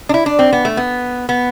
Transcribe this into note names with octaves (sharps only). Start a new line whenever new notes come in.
D4
E4
D4
C4
B3
A3
B3
B3